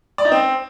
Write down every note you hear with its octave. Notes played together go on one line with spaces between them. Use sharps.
D5
D#4
C4